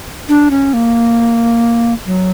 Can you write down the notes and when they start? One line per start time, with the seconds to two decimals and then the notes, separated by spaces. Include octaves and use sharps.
0.29 D4
0.51 C#4
0.73 A#3
2.06 F#3